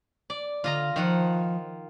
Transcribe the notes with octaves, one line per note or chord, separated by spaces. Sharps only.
D5
D3 F4 D#5 A#5
D#3 F3 F4 F#5